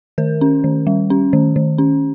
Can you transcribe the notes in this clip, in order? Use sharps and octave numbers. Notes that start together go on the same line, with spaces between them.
D#3 A#4
C#4
D#3
G3
C#4
D#3
D#3
C#4